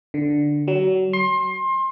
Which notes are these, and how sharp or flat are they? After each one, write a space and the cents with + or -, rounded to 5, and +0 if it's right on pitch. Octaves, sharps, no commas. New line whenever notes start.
D3 +0
F#3 +25
C6 +25